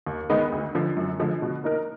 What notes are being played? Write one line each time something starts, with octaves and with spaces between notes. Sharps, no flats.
D#2
D#3 G#3 B3 D#4
D2
D3 F3
F#2
D3 F3 G#3
B2
A#3 D#4 A#4